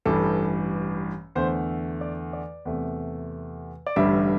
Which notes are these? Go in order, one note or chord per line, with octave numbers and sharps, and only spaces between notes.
A1 G2 E3 G3 A4
E2 D3 A3 C5
D5
D5
E2 C3 A3
D5
A1 G2 D3 G3 E5